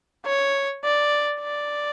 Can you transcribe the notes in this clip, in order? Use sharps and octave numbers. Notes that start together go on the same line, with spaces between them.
C#5
D5
D5